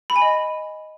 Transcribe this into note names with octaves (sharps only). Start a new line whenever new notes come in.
B5
G#5
D#5